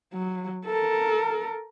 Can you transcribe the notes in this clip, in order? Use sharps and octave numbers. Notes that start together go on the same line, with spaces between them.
F#3
A4 A#4